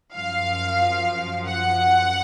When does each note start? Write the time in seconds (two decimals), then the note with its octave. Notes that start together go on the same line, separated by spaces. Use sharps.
0.15 F#2 F3 F5
1.48 F#5